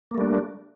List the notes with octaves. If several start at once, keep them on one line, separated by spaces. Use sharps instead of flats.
G3 A3 A#3 D4